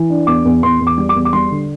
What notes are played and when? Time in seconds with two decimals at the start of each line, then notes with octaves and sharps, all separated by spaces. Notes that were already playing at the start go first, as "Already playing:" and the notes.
Already playing: E3
0.09 D4
0.27 E2 D6
0.45 E2
0.63 E2 C6
0.80 E2
0.87 D6
0.98 G3
1.09 D6
1.15 E2
1.25 D6
1.33 G3 C6
1.51 D3